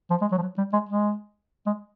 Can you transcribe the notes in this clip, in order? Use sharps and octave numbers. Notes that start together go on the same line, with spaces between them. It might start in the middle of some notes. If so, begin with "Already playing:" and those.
F3
G#3
F#3
F3
F#3
G3
G#3
G#3
G#3